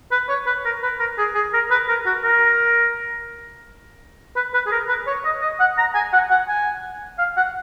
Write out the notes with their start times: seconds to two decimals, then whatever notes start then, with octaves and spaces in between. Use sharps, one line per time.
0.11 B4
0.29 C#5
0.46 B4
0.65 A#4
0.83 B4
0.99 A#4
1.18 G#4
1.35 G#4
1.53 A#4
1.71 B4
1.88 A#4
2.06 F#4
2.24 A#4
4.36 B4
4.54 B4
4.66 G#4
4.72 A#4
4.88 B4
5.07 C#5
5.25 D#5
5.42 D#5
5.60 F#5
5.77 A#5
5.95 G#5
6.13 F#5
6.30 F#5
6.48 G#5
7.18 F5
7.37 F#5